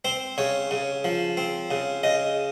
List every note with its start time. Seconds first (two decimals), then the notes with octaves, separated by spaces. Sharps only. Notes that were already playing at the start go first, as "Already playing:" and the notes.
0.05 C4 C5
0.38 C#3 C#5
0.71 C#3
1.04 F3
1.37 C4
1.71 C#3
2.03 C#3 D#5